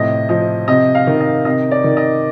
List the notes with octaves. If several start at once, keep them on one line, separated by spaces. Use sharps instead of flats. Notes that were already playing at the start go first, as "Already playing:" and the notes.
Already playing: A2 C3 F3 D#5
F3 D#5
C3 D#5
F5
D#3
D#5
C3 D#5
D5
D#3
D#5